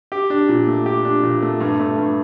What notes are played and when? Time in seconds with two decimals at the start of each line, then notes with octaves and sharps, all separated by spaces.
0.12 G4
0.30 D4
0.49 A#2
0.67 A3
0.86 G4
1.05 D4
1.23 A#2
1.42 A3
1.60 G2
1.80 A3
1.98 G2